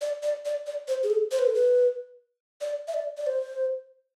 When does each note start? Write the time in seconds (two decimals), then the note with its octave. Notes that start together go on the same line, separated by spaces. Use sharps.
0.01 D5
0.23 D5
0.45 D5
0.67 D5
0.88 C5
1.03 G#4
1.10 A4
1.32 C5
1.39 B4
1.47 A4
1.55 B4
2.61 D5
2.88 E5
2.94 D5
3.17 D5
3.27 C5